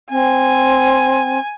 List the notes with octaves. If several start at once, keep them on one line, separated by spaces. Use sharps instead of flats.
C4 G#5